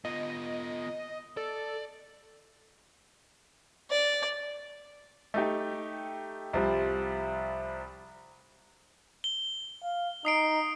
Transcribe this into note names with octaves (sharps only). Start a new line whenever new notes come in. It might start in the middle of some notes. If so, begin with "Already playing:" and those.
B3 F4 D#5
A4 D5
D5
A3 D#4 G4
C2 F3 G3
G7
F5
D#4 D#6 C7 D7